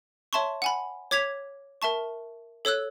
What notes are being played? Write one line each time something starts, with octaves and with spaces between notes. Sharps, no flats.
C#5 E5 A5 C6 C#6
F#5 G#5 B5
C#5 D6 G#6 B6 F7
A#4 E5 A5 C#6
A4 C#5 E6 F#6